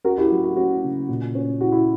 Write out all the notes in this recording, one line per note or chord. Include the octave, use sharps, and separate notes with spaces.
C#4 F#4 A#4
E4 G4
F#3 F#4
F#4
C#4 F#4
C#3
A#2
C#4
E4 F#4
E4